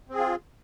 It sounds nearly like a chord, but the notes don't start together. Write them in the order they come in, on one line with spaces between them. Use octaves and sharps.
C4 G#4 F4